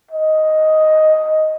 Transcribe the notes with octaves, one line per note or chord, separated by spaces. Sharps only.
D#5